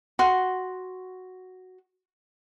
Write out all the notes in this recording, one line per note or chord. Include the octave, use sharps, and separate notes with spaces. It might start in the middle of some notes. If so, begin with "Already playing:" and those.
F#4 C6